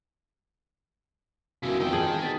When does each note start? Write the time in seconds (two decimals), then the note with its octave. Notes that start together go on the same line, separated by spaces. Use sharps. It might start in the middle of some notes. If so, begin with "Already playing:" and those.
1.63 G1 C#3 E4 F#4 A#4
1.80 F2 D#4 G5 E6
1.93 G#4 A5 F#7
2.08 E1
2.23 B2 A6 B6